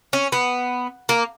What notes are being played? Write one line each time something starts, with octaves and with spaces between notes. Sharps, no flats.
C#4
B3
A#3